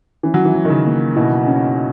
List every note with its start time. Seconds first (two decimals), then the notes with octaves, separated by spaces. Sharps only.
0.23 E3 C#4
0.34 F#3
0.45 E3
0.54 F#3
0.65 D#3
0.70 C#3
0.85 A#3
1.16 B2 E4
1.47 C#4